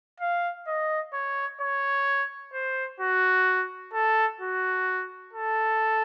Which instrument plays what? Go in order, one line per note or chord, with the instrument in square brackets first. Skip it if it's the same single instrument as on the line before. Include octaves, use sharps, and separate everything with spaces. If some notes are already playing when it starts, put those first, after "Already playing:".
[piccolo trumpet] F5
D#5
C#5
C#5
C5
F#4
A4
F#4
A4